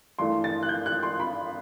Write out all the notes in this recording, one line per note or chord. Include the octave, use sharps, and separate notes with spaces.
G2 E3 A3 C6
A6
F#6
G6
F#6
C6
B5